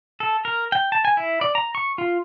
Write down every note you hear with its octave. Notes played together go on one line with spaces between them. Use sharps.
A4
A#4
G5
A5
G#5
E4
D5
A#5
C#6
F4